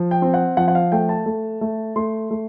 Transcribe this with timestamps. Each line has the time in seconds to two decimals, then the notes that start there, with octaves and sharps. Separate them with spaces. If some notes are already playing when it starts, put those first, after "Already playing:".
Already playing: F3
0.11 G5
0.22 C4
0.34 F#5
0.57 F3 F#5
0.68 F#5
0.75 F5
0.92 A3 G5
1.09 A5
1.26 A3
1.61 A3
1.96 A3 C6
2.31 A3